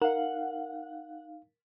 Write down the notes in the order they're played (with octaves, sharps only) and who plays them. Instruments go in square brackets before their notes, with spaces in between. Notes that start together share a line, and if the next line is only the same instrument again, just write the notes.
[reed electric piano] D#4 F5 [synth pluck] A#4 [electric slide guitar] F#5